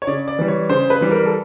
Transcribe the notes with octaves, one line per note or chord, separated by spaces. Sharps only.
C#5
C#3 D5
D5
E3 G3
C#5
C#3 C5
B4
E3 G3
A#4
A4